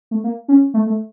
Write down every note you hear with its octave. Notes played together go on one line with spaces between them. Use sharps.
A3
A#3
C#4
A3
A3